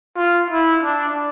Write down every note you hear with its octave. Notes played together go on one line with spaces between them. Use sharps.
F4
E4
D4